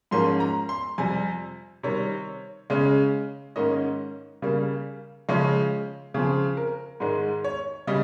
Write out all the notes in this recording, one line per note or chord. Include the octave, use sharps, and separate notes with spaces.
G#2 F3 A#3 C#4 C6
A#5
C6
F2 C3 G3 G#5
C3 D#3 G3 C#5
C#3 G#3 C#4
G#2 D#3 A#3 C#4 D#5
C#3 G3 A#3
C#3 F3 G#3 C#4
C#3 F3 C4 G#4
A#4
G#2 D#3 G#3
C#5
C#3 G3 D#5